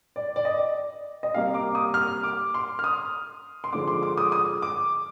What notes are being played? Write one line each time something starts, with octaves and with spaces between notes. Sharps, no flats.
D5
D5
D#5
D#5
C3 G3 A#3 F5
D6
D#6
F6
D6
C6
F6
D#6
C6
D3 F3 G#3 D6
C6
D6
D#6
D#6
D6